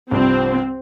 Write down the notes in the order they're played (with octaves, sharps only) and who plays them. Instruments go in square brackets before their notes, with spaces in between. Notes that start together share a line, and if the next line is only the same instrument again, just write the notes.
[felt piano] C2 G2 F3 [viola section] C4